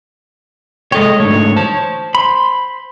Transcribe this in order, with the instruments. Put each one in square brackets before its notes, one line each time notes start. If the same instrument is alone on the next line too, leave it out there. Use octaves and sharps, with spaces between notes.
[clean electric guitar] G#3 A4 G5 [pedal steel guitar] C#5 D#5
[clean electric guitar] G#2 D3 A3 [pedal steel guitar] C#5
[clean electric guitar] C5 A5
[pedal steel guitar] B5 C6